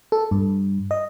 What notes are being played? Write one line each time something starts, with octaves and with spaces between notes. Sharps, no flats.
A4
G2
D#5